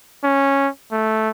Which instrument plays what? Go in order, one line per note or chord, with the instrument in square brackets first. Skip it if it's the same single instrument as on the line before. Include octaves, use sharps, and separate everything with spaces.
[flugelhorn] C#4
A3